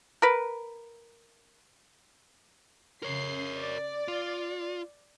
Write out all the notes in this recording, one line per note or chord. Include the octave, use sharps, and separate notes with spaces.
A#4 B4
C#3 A#4 C#5 C7
D5
F4